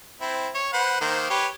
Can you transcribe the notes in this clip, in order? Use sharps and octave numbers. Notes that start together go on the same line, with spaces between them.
C4 E4
C#5
B4 C5 F#5
D#3 A#3 C5
G4 B4 C#5